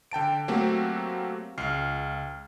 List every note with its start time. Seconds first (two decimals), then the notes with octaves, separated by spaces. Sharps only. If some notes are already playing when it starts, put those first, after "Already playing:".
0.12 D3 G5 A5 D7
0.48 F#3 A3 A#3 C4 F#4 G4
1.58 C#2 F6 C7